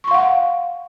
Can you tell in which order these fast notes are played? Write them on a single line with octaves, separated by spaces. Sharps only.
C#6 C6 F5 F#5